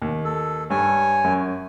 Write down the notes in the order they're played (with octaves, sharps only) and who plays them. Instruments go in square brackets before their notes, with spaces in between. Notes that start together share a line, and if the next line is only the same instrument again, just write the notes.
[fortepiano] D#2
[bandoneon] A4
[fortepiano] G2 [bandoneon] C#5 G#5
[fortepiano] F#2